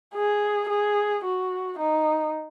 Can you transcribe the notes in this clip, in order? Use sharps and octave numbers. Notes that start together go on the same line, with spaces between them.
G#4
G#4
F#4
D#4